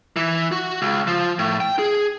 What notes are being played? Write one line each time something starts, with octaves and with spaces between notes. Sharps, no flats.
E3
F#4
C#2
F3
A2
G5
G#4